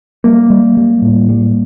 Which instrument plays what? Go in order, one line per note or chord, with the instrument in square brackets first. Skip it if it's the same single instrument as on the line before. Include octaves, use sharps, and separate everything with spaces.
[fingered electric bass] G3 [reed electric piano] A#3
[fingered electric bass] G3
G3
A2
G3